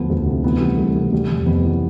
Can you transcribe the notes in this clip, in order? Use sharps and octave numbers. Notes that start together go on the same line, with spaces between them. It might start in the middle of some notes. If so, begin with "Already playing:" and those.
Already playing: D2 F3 B3
D2
C3
E3 B3
G3
C2 A3
C3
G3
F2
F2 B3
E3